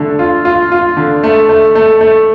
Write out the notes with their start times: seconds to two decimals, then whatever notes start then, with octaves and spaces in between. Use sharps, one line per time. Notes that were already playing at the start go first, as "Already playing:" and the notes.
Already playing: D3 A3
0.19 F4
0.45 F4
0.72 F4
0.97 D3
1.23 A3
1.49 A3
1.75 A3
2.01 A3